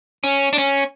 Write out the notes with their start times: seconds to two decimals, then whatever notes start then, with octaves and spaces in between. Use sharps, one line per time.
0.24 C#4
0.53 D4
0.58 C#4